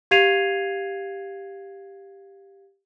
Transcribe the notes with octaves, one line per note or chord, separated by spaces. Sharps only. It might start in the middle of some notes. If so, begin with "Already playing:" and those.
G4 F5 G#6 C7 D#7 F7